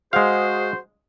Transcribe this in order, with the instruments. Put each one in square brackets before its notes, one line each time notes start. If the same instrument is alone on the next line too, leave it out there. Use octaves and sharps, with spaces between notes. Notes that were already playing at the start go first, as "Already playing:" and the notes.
[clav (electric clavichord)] G#3 F5 [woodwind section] F#4 G#4 C5